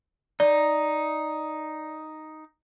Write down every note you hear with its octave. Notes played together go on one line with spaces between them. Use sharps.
D#4 D5